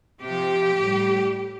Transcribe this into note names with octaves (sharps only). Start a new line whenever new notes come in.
C3 F3 G4
A2 G3